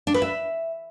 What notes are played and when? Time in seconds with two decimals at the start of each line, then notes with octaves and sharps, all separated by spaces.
0.07 D4
0.14 B4
0.22 E5